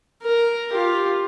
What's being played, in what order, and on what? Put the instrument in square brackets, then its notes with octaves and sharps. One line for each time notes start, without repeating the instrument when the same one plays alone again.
[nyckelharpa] A#4
F4 G4